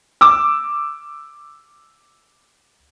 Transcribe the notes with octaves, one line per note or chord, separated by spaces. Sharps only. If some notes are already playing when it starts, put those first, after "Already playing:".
D6 E6